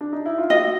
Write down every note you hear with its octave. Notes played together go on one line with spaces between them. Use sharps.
D4
D#4
E4
F4
F#4 D#5